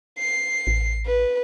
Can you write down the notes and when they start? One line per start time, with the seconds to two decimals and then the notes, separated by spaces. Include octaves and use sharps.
0.18 C7
0.67 A1
1.06 B4